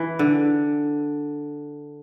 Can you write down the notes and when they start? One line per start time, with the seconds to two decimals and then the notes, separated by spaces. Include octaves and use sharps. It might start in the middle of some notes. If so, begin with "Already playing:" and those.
Already playing: E3
0.19 D3